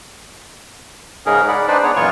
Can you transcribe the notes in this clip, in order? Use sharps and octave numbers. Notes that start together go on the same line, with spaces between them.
G#2 C#3 C#4 D#4 G#4 A#4
D5 F#5 B5
D4 D#4 B4 C5 D5
B3 G#4 C#5
F#2 A#2 E3 F4 C#5 C#6